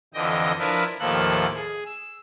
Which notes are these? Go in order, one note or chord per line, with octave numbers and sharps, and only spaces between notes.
F2 D3 E3 D#5 G5 A#6
F3 D4 E4 A#4 B4
D#2 A2 F3 A#3 A4 F#6
G#4
E6